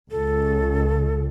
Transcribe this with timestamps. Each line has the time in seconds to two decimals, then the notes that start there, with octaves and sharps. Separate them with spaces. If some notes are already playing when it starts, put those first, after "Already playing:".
0.11 C#2 A4